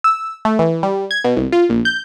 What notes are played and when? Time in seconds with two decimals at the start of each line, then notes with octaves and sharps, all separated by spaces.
0.04 E6
0.45 A3
0.59 E3
0.83 G3
1.11 G#6
1.24 B2
1.37 C2
1.52 F4
1.69 A#1
1.85 G6